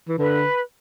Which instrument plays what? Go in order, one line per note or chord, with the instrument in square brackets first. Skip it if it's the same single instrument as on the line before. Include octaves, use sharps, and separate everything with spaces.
[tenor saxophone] E3
[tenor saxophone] D3 [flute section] B4